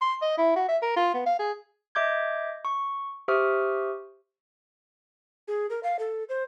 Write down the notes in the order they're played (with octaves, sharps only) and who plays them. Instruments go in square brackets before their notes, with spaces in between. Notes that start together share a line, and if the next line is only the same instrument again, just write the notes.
[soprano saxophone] C6
D#5
E4
F#4
E5
A#4
F4
B3
F5
G#4
[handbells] D#5 E5 D6 G6 G#6
C#6
G4 C5 E5 C#6 D#6 F6
[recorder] G#4
A#4
F5
A4
C5